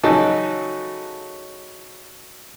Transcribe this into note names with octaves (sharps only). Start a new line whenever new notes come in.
C#3 F#3 D#4 A4 A5